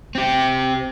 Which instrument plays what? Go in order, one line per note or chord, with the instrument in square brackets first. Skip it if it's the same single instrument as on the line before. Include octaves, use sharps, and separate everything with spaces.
[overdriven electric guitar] C4 G4